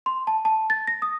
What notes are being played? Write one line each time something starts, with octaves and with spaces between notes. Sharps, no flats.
C6
A5
A5
A6
A#6
D#6